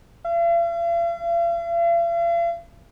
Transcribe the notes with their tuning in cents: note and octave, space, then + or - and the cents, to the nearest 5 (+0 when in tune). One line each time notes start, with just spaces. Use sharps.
F5 -45